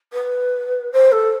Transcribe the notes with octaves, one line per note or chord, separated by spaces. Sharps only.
B4
C5
A4